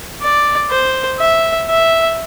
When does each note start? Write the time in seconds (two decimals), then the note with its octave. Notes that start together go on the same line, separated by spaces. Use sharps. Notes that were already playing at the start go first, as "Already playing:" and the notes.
0.22 D5
0.71 C5
1.20 E5
1.70 E5